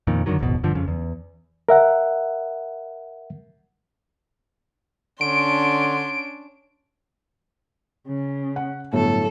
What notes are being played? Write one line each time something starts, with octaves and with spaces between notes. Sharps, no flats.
F2 A#2 D#3
F#2 D3 D#3 F#3
D1 G#1 F2 B2
G2 D3 F3
F2 C#3
E2
A#4 E5 F#5
D3 C#4 D4 C6 D7
C#3
F#5
G1 A2 F#3 A4